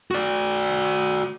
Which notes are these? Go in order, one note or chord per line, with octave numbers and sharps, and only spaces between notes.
F#4 D5